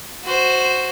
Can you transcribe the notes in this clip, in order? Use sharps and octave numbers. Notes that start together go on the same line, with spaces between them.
F#4 C5